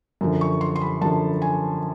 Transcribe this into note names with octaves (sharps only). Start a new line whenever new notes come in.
F#2 D3 F3
C#6
C6
C6
B5
F#2 D3 F3 A5
G#5